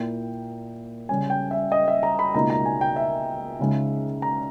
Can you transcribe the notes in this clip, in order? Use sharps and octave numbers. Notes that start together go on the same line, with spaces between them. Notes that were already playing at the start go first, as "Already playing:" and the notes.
Already playing: A#2 A#3 E4 G5
C#3 G3 C#4 G#5
G5
E5
D#5
E5
A#5
B5
C#2 B2 A#3 D#4 A#5
A#5
G#5
G5
E5
C#2 C#3 G#3 D#4
A#5